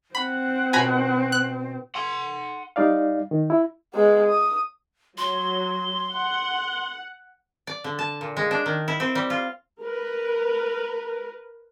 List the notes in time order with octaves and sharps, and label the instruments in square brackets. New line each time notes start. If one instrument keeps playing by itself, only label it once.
[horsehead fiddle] C4 [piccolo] F#5 [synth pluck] B5
[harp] B2 C#4 F#4 [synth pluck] G#5 A#5 B5
[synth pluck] F#6
[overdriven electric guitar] F#5 C6
[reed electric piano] G3 D#4 D5 F5
D#3
E4
[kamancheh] G#3 B3
D#6
[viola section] F#3 [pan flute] C6
[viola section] F#5
[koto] D5
D3
A5
A#2
G#3
D4
D#3
E4
C4
G3
F4
[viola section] A#4 B4